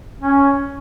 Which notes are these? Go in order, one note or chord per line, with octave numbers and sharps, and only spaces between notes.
C#4